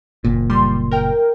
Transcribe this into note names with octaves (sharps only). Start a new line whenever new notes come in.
F#1 A#2
G3 C6
A#4 G5